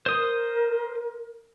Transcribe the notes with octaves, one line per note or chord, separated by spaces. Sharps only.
A#4 C5 D#6